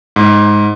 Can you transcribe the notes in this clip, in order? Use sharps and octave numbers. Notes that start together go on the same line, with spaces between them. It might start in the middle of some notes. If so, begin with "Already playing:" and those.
G#2